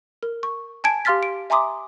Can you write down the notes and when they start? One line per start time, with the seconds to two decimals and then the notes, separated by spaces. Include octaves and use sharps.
0.23 A#4
0.43 C#6
0.84 G#5 A5 G#6 D7
1.05 G4 F5 C6 F6 A6 B6
1.23 D7
1.50 E5 G#5 A#5 C6 D6 D#6